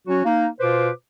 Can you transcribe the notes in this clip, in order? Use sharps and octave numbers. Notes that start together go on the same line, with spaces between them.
F#3 C#4 F#4
A#3 D#4
B2 F4 B4 C5 D6